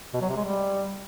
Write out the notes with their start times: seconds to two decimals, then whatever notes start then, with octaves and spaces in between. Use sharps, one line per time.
0.13 B2
0.21 F#3
0.29 C3
0.37 G#3
0.44 G3